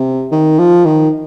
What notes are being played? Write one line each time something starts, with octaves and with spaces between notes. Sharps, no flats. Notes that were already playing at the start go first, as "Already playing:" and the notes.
Already playing: C3
D#3
F3
D#3